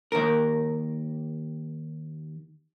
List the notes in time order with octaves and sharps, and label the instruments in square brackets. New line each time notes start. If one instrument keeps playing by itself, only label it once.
[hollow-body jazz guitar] D#2 A#4